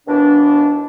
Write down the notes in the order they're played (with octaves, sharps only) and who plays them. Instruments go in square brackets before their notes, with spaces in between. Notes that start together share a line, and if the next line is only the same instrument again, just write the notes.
[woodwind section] D#2 B2 E3 D4